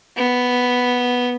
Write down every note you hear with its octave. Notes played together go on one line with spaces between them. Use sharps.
B3